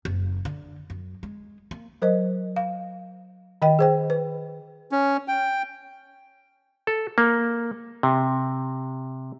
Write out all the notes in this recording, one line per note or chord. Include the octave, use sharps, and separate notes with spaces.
F#1
D3
F#2
G#3
A#3
F#3 A#4 C5 D#5
F5
D#3 D#5 G5
G#4 C5 G5
B4
C#4
G5
A4
A#3
C3